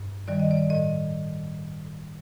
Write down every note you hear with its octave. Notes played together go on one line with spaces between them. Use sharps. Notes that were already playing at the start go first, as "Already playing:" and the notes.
Already playing: G2
D#3 G3 D5
D#5
D5
A2 D#5